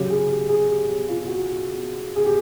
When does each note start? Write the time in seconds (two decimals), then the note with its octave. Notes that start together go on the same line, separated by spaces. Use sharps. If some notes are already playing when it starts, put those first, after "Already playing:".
Already playing: C#3 F#3 G4
0.10 G#4
0.30 G4
0.49 G#4
0.69 G4
0.88 G4
1.08 F4
1.28 F#4
2.16 G#4
2.25 G4